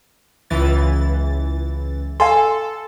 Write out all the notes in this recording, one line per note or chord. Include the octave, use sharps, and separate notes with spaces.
C#2 E3 A6
A4 F5 G#5 C6